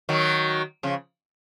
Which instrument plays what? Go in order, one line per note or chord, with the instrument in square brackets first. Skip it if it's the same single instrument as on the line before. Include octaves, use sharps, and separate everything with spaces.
[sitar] D#3 F#3
C#3 F3